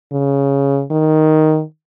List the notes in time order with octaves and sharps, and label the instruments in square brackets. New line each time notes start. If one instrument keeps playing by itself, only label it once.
[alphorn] C#3
D#3